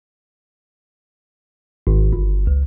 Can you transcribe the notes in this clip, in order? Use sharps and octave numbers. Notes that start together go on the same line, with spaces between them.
G#1
G1
C#2